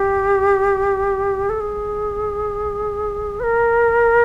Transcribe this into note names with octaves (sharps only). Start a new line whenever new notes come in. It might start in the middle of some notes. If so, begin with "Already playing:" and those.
Already playing: G4
A4
G#4
B4
A#4